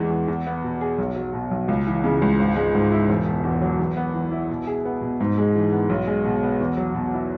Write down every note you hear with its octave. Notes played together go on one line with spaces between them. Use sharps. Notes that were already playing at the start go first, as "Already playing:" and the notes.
Already playing: E2 E3 G#3
E2
E2
B3
B2
G#4
B1
F#3
B2
B1
C#2
E3
C#3
C#2
G#1
G#3
G#2
E4
E1
B2
E2
F#3
E2
B3
E3
E4
B2
G#4
B3
B2
G#2
G#3
E3
B3
B1
G#3
B2
B3
E2
F#3
B2
E4